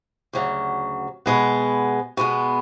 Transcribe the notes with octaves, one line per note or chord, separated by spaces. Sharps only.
D2 C#3 F#3
B2 G#3 B3
B2 G#3 B3